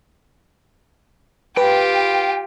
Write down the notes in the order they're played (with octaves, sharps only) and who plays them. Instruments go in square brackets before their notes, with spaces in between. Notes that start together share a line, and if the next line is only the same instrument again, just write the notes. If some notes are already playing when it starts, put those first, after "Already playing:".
[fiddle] F4 G4 [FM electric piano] B4 [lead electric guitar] G5